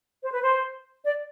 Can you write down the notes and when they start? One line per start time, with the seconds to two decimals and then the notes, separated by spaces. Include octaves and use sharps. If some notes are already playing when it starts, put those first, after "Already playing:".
0.23 C5
0.32 B4
0.41 C5
1.05 D5